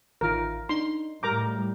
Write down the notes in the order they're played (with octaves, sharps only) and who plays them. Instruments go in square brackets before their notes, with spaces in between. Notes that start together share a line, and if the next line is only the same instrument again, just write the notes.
[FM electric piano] A1 D#3 F4 [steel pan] A#4
[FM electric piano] D4 D#4 [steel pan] C6
[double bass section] A2 G3 [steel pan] A#4 A#5 D6 [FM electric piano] G6